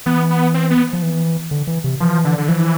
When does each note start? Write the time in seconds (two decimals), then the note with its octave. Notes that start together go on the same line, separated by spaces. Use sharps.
0.06 E3 B3
0.30 B3
0.54 C4
0.71 B3
0.93 F3
1.03 E3
1.51 D3
1.67 E3
1.84 C3
2.00 E3 F3
2.25 D3
2.38 D3
2.48 E3 F3